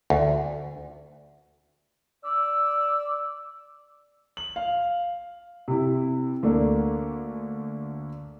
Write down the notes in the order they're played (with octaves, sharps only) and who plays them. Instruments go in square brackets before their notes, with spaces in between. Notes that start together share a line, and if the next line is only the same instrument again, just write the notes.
[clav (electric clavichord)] D2
[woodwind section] D5 E6
[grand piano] F#7
F5
C3 E4
D2 A3 A#3 D4